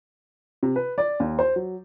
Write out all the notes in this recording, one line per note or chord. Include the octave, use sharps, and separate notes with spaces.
C3
B4
D5
D#2
C5
F#3